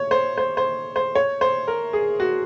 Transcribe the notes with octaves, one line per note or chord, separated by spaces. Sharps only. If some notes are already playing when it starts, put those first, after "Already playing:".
Already playing: C#5
C5
C5
C5
C5
C#5
C5
A#4
G#4
F#4